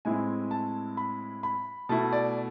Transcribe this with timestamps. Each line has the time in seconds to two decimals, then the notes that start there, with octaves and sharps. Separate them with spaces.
0.05 A2 G#3 C4 E4 G#5
0.51 A5
0.97 B5
1.43 B5
1.89 B2 A3 E4 A5
2.12 D5